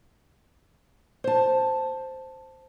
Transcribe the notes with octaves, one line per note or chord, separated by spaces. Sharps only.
C5 A5